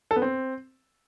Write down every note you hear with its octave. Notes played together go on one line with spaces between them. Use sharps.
A4
B3
C4